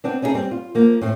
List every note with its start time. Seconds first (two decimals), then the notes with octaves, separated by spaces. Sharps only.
0.04 B3 C4 D4
0.22 C#4 D#4 E4 F#4 G#4 A4
0.34 G3 C4
0.51 F4
0.75 F3 A#3
1.02 A2 C4